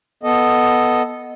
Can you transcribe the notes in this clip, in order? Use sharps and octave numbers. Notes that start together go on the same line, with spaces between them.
B3 A4 D#5